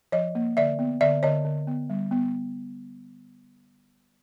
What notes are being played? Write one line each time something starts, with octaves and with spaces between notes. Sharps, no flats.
F3 C#5 D#5
A#3
D3 D5 E5
B3
D3 D5 E5
D3 C#5 D#5
D3
B3
G3
B3